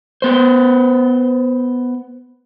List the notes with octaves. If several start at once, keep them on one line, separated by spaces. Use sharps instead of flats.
B3 C5